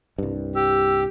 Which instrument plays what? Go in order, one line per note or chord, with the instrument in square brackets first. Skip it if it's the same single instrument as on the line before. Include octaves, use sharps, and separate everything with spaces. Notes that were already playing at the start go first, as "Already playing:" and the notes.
[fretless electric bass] C2 G2
[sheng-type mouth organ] G4 [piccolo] E6